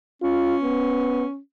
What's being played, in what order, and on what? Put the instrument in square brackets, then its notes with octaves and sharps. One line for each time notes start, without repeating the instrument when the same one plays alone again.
[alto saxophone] C#4 [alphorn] F4
[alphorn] B3